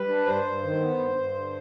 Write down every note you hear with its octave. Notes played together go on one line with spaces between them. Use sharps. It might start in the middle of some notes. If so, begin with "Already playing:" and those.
Already playing: G3 B4
D4
G2 C5
G2
D#3
B3
G2
G2
D3